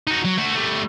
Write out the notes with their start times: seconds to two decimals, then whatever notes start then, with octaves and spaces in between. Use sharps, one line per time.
0.07 D#4 F#4
0.25 F#3
0.38 A3 F#4
0.55 G3 A3